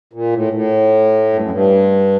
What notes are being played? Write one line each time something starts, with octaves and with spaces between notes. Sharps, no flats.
A#2
A2
A2
G2
F#2
G2